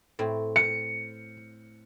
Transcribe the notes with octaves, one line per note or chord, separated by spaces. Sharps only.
A2 C4
C#7